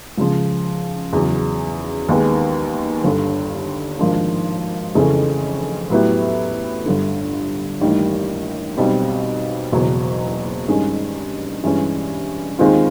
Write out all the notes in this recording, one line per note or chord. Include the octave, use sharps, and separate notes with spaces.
C#2 C#3 F3
E2 C#3 F#3
D#2 D#3 G#3 B3
G1 G2 D3
G#1 G#2 F3 A#3 D4
F2 C#3 E3 A3 C#4
A2 F#3 B3 E4 G4
G1 G2 D3
A1 G2 D#3 G3 A#3
B1 B2 G3 C4
F#1 E2 B2 F#3
G2 D#3 G#3 C#4
G2 E3 G#3 C#4
D#2 D#3 G#3 C4 F4